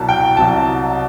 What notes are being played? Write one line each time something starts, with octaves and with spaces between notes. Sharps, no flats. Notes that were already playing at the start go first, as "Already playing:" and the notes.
Already playing: C2 B2 F#3 A5
G5
C2 C3 F#3 A5